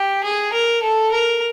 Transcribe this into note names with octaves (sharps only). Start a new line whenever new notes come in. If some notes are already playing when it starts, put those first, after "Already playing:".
Already playing: G4
G#4
A#4
A4
A#4